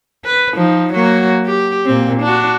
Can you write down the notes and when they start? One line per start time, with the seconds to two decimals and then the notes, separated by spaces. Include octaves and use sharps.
0.25 B4
0.54 F3 D#4
0.93 F#3 A#3 F#4
1.46 G4
1.86 A#2 C4
2.22 D4 F#4